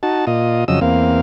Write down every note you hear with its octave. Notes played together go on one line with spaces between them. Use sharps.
D#4 F#4 A5
A#2 F4 D#5
F2 C#3 F#3 D#5 E6
E2 A#3 C4 F5